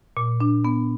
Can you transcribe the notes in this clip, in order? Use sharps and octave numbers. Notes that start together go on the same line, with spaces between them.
A#2
D4
B3